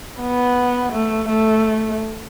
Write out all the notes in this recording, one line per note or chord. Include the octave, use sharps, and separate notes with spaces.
B3
A3
A3